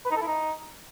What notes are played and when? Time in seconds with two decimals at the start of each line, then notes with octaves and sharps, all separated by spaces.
0.06 B4
0.11 D#4
0.16 A4
0.22 E4
0.27 D#4